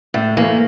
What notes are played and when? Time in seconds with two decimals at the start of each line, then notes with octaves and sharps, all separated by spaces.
0.14 A2 A3
0.37 E3 A#3
0.42 A3